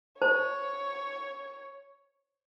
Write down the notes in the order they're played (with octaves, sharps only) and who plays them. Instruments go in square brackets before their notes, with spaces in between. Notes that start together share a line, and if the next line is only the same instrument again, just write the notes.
[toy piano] C5 [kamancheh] C#5